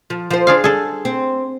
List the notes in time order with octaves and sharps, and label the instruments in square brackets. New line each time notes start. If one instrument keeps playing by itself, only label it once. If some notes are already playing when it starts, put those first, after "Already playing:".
[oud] F3
F3 C5
[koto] D4 G#4 F5
[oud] G3 [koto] G#4 A4
[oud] C4